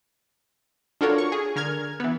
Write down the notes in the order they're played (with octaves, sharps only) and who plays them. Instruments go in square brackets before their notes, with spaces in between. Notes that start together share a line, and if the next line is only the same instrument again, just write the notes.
[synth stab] D4 F4 F#4 A4 A#4 C#5
C#6
G#4
D3 A#4 F6 G#6
E3 B3